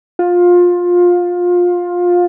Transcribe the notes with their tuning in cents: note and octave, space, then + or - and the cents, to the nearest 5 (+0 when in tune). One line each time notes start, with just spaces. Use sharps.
F4 +20